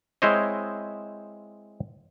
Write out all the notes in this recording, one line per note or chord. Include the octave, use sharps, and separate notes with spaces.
G#3 C4 E4 C5 C#5 D#5